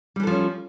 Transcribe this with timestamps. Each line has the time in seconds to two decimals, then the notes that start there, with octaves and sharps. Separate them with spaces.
0.16 G3
0.20 E3
0.23 A4
0.27 F3
0.31 C#4